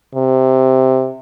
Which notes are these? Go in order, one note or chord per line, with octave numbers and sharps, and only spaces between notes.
C3